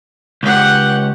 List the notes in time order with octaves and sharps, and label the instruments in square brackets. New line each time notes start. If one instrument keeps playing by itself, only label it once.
[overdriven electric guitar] C#2 [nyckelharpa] G4 F#5